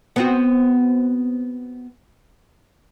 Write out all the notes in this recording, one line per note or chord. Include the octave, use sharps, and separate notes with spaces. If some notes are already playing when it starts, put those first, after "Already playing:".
B3 C4 F#4